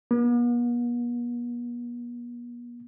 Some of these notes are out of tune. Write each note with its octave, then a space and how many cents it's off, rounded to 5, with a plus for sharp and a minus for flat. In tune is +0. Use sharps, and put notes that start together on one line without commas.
B3 -45